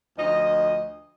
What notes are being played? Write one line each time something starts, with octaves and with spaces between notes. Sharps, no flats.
D2 F3 D#5